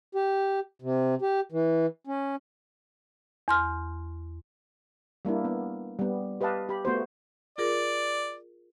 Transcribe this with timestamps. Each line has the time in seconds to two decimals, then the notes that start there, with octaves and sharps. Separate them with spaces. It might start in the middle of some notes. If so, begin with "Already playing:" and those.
0.15 G4
0.82 C3
1.22 G4
1.52 E3
2.07 C#4
3.48 E2 C6 F6
5.25 G3 A#3 D4 E4
5.45 B3
5.99 G3 B3
6.41 G4 B4 D#5 F5 A5
6.69 G4 B5
6.85 A3 B3 F#4 C5
7.58 F4 G#4 A#4 D5